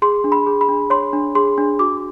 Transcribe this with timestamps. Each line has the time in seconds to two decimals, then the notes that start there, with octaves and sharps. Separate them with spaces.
0.02 G#4 C6
0.24 D4
0.32 B5
0.47 G#4
0.61 B5
0.69 D4
0.90 C#5 C6
1.13 D4
1.35 G#4 C6
1.58 D4
1.79 F#4 D6